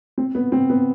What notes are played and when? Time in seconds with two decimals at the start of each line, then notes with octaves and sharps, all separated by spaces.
0.18 C4
0.35 B3
0.52 C4
0.70 B3